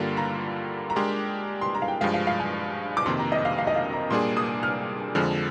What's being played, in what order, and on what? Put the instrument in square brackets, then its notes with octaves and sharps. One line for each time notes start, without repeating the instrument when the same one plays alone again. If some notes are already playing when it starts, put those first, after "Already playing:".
Already playing: [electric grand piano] G2 D3 G3 A#3 F4
[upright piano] A#5
A#5
[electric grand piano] G#3 D4 G4 A#4 [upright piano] C6
[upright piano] C6
A#5
F5
G5
[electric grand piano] G2 F3 G#3 [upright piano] F5
[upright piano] F5
F5
G#5
D6
[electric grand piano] F2 C3 D#3 A#3 [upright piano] C6
[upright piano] A#5
D#5
F5
F5
D#5
F5
A#5
[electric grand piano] A#2 G3 A#3 D4 G#4 [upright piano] C6
[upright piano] D#6
F6
[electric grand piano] F2 D3 F3 G#3 [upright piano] F6